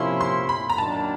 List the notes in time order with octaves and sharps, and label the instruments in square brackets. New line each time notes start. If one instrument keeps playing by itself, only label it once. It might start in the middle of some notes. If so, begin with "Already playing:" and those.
Already playing: [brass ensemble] C3 F3 A#3 C#4 E4 [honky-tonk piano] C6
[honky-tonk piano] C6
B5
A#5
[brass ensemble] F#2 D#3 F#3 A#3 D4 [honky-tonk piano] A5